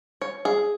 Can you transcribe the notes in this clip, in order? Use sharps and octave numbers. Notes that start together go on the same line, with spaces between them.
C#5
G#4